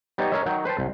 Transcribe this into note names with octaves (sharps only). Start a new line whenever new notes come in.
G3 B3 D#4 C#5 D#5
C#4 A#4 C#5 D#5 E5
D#3 F#3 F#5 G5
B4 C5 G5 A5
C2